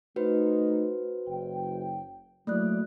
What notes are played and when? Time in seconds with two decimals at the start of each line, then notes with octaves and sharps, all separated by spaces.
0.16 A3 D#4 F#4 B4 C5
1.28 F#1 G5
2.47 F#3 A3 A#3 E4 D5 F#6